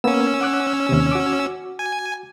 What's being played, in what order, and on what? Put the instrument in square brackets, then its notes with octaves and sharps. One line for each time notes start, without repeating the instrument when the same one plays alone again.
[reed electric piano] A#3 B3 [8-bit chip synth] C#4 E6
[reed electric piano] F#5 D6 F#6
D#2 C3
F#4 D6
[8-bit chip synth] G#5